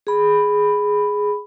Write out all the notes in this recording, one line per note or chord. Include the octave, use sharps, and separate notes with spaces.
G#4 B5